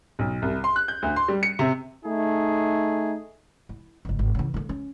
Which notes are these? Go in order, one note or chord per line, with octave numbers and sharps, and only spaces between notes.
B1
C2
C6
F#6
G6
D2
C6
G3
C#7
C3
A3 D#4 G#4
E4
G1 C#2
G#1
C#3 E3
D3 A#3
C#4